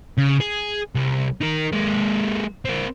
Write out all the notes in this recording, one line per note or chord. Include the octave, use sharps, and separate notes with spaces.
C#3
G#4
C2
D#4 A#4
G#3 A#3
C4 A#4